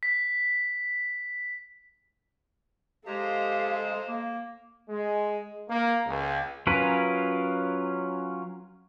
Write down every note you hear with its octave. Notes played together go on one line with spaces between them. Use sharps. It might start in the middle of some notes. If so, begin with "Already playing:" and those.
B6
G#3 G4 A4 C5 D#5 F5 A#5
A#3
G#3
A#3
C#2
F#3 C#4 F4 A#4 B4